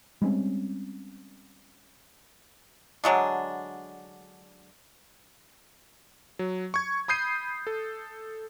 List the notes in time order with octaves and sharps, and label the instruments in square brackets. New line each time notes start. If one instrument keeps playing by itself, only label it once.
[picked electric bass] G3 G#3 C4 C#4
[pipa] D3 F#3 G#3 D4
[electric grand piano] F#3
C#6 G#6
B5 D#6 G6 C7 D#7
A4